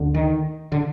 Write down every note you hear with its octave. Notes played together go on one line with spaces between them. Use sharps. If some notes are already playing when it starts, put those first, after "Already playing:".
Already playing: D2 D3
D#3
D3